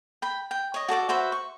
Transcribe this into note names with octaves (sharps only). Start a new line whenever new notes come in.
G5 B5
G5
C#5 D#5
F#4 A4 D5 D6
F#4 B4 C5 E5
C#6